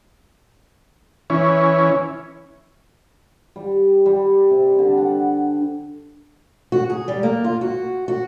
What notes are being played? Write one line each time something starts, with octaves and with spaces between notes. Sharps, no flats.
E3 C#4
G3
G3
C3
D3
F#5
F#4
G#4
G3
A#3
F4
F#4
F#4